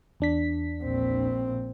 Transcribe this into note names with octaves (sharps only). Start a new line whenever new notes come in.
E2 D4 B6
A#1 C4